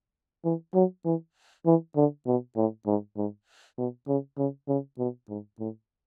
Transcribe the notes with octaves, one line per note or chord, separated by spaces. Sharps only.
E3
F#3
E3
E3
D3
B2
A2
G#2
G#2
B2
C#3
C#3
C#3
B2
G#2
A2